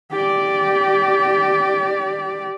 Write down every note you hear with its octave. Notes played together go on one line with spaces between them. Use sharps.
G4 D5